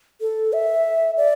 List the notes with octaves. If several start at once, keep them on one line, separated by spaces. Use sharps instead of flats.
A4
E5
D5